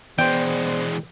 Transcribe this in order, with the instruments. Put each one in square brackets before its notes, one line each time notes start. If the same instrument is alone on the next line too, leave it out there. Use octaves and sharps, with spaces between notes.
[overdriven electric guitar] E3 G#3 [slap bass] B3 [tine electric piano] C5 D5 [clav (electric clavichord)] G5